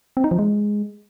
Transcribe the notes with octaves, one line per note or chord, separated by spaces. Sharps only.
C4
D#4
F3
G#3